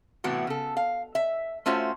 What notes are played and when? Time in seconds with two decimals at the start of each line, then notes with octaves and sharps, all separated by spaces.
0.24 A2 C3 E3 B3 F#4
0.47 C#3 A4
0.77 F5
1.15 E5
1.66 A3 C#4 F4 F#4 C5 E5